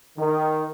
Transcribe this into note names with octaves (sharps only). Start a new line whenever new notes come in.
D#3